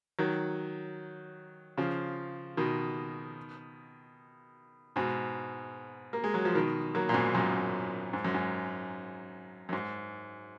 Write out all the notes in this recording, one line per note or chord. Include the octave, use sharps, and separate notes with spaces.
D#3 F#3
C#3 F3
B2 D#3
G#2 B2
A#3
G#3
F#3
F3
B2 D#3
F#3 A#3
A#2
G#2 B2
F#2 A#2
G#2
F#2
G#2
F#2
G#2